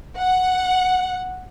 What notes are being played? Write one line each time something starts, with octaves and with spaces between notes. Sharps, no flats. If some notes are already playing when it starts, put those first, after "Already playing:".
F#5